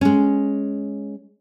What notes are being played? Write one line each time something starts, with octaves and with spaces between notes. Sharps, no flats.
G#3 C#4